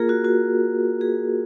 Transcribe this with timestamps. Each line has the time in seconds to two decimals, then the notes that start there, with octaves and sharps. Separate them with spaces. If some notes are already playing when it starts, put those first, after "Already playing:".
Already playing: A#3 F4 G#4 A#4
0.09 F#4
0.25 F#4
1.01 G#4